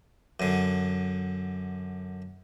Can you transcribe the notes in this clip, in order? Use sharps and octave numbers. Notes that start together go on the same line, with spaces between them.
F#2 D3